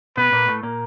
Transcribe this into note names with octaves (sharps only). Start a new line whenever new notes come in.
B2 B3 B4
A#2 A#3
A2 A3
A#2 A#3